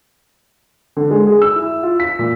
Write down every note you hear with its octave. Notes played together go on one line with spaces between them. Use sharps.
D3
G#3
G#4
E6
E4
F4
B6
A#2